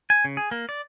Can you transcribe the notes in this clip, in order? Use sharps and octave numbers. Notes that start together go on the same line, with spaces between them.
G#5
C#3
G#4
A#3
D5